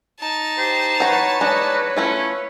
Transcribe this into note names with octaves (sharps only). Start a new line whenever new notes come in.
D#4 A5
G4 C5
F#4 B4 C#5 A#5
G#3 D4 F#4
A3 C#4 E4 F4